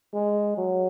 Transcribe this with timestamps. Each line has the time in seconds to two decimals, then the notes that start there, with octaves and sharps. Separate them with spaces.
0.14 G#3
0.57 F#3